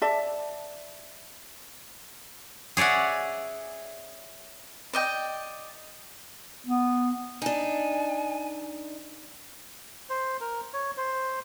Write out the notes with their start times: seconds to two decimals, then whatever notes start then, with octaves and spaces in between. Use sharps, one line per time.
0.02 D5 E5 A5
2.77 G#4 C#5 D5 E5 F#5
4.93 D5 D#5 G5
6.67 B3
7.42 D4 D#4 G#5
10.10 C5
10.41 A#4
10.73 C#5
10.97 C5